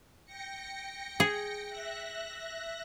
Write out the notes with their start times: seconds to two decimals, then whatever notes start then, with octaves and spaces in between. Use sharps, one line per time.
0.25 G5 A#6 C#7
1.20 G#4
1.67 E5 F#6 A#6